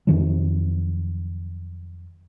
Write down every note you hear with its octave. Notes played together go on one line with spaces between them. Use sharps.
F2 D#3 F#3